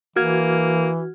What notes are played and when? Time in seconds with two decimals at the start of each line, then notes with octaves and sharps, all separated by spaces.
0.16 E3 A#3 F#4 F6 G#6